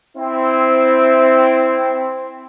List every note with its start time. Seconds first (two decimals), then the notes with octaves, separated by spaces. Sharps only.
0.17 C4 E4